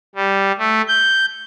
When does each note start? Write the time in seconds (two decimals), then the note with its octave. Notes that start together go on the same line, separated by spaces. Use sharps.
0.15 G3
0.59 A3
0.88 G6